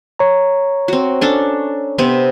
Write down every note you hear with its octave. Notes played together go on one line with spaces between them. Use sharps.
C#5 A#5
C4 F#4
C#4 D4 A4
C3 B3 C4